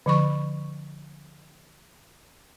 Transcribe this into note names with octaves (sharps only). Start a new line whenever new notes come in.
D3 F3 B5 C#6